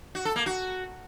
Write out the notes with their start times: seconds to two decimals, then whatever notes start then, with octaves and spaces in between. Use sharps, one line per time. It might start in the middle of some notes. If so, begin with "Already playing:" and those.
0.15 F#4
0.25 A4
0.36 A#3
0.46 F#4